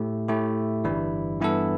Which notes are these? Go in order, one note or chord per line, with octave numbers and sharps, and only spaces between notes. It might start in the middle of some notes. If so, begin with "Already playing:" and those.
Already playing: A2 A3 E4 G4
A2 A3 E4 G4
G1 G2 E3 G3 E4
G2 E3 B3 E4 A4